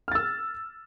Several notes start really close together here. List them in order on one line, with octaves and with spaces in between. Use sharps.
F6 A6 E6